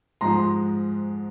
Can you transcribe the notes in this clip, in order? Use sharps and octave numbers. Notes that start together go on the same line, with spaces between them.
G#2 F3 G#3 A#5 C6